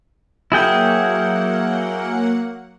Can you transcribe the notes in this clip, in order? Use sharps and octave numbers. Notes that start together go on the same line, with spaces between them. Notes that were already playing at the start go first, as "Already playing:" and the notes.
F#3 A#3 E4 G#4 F#5 G5